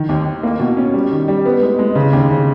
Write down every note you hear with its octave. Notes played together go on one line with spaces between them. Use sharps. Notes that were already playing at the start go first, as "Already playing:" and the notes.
Already playing: D#3
D#2
D#3
A#3
B2
C#4
G3
D#3
G3
B3
G#3
G#3
C#3
D#2
C#3